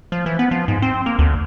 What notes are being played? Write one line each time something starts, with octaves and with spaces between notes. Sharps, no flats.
F3
E3
B3
F3
G#2
C4
A#3
D2